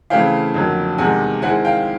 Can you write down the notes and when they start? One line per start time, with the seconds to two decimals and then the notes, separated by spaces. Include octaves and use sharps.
0.10 C#3 E3 A3 C4 E4 F5 G5
0.54 F2 D3 F#3 A#3
0.98 E2 C3 D#3 G#3 F#5 G#5
1.42 D#3 G#3 C4 E4 F#5 G#5
1.65 F5 G5